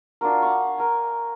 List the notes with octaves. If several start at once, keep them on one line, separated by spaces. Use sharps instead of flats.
D4 F4 F#4 A#4
F5 F#5 C#6
A#4 G#5